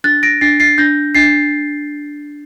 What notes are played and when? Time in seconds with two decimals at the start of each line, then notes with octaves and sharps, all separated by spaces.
0.04 D4 F#6 A6
0.23 A#6 D7
0.41 D4 A6 C7
0.60 A6 C7
0.78 D4 G6 A#6
1.15 D4 A6 C7